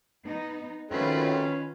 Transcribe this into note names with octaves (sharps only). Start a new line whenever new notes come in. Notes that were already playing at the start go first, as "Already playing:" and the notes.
B3 D#4
D#3 F#3 A3 C4 C#4 F4 B4